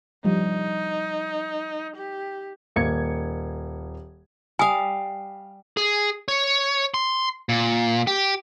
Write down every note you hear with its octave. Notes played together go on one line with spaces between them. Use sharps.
F3 G3 D#4
G4
D#1 A#3 G#6 C#7
G3 F5 G#5 D#6
G#4
C#5
C6
A#2
G4